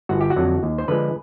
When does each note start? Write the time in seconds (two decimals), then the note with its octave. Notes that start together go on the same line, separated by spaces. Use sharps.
0.09 G1 F#4
0.21 G4
0.30 F#4
0.36 F2 D3 F#3
0.63 D#2
0.78 C5
0.88 D3 F3 G#3 B4